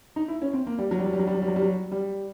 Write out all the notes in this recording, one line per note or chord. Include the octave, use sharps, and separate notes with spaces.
D#4
E4
C#4
C4
A#3
G3
F#3
G3
F#3
G3
F#3
G3
F#3
G3
F#3
G3
F#3
G3